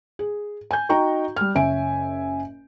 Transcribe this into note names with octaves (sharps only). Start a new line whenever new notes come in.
G#4
G#5 G6
D#4 F#4 G5 A#5 C#6
G3 F6
F#1 C#4 E5 G#5 D7